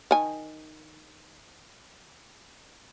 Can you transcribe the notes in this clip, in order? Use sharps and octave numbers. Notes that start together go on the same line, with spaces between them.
D#3 G#5